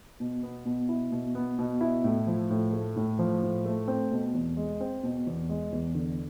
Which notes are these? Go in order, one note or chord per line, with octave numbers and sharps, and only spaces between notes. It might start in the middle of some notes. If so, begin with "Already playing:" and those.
B2
B3
B2
E4
B2
B3
B2
E4
A2
F3
A2
A3
A2
F3
A2
A3
C4
B2
E2
G#3
C4
B2
E2
G#3
E2
D3